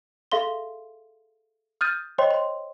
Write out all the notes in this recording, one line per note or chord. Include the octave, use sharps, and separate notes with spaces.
G#4 A4 E5 F5 C6 G7
D#6 F6 G6 A6 D#7
C5 C#5 D#5 G5 C6
C6